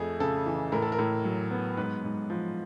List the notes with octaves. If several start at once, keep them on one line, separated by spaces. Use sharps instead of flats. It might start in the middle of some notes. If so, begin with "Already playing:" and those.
Already playing: F2 A3 G#4
C#3 A4
E3
A2 A#4
A4
A#4
A2
F#3
B3
G#2 B4
G#2
F3